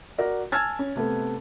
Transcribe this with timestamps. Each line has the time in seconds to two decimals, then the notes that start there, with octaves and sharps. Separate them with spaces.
0.18 F#4 A#4 D5
0.52 G#5 A5 E6 F6 G#6 A6
0.79 C#4
0.96 C3 A3 B3 A4